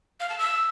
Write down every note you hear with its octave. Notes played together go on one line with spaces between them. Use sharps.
F5
A5
E6